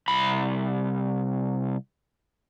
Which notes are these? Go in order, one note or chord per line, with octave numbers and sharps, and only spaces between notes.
C2 B5